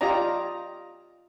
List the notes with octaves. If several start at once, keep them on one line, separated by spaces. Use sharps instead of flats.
F4 G4 D5 D#5 A#5